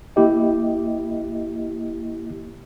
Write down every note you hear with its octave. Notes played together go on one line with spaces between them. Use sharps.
A#3 E4 G4 D#5